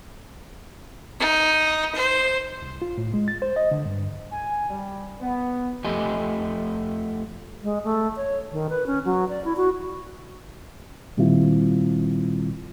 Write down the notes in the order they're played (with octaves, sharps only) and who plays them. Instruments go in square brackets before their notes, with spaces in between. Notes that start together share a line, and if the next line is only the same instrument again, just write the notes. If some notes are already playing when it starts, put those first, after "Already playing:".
[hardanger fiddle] D#4
C5
[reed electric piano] C2
F4
A2
G#3
A6
C5
D#5
D3
G2
[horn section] G#5
G3
B3
[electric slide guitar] F2 F3 A3 G4 D#5 G#5
[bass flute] G#3
A3
C#5
D#3
B4
C#4
F#3
D5
E4
F#4
[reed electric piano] A#2 D#3 G3 C4 E4 F4